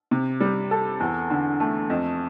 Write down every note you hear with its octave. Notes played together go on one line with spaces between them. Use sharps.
C3
G3
A4
E2
D3
A3
F2